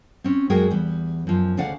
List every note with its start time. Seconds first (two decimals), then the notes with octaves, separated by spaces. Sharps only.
0.24 C4 C#4
0.50 F#2 G#3 F#4 G#4 A#4 G5
0.71 E2 G3
1.27 F#2 F3
1.57 D2 C#3 D4 D5 F5 F#5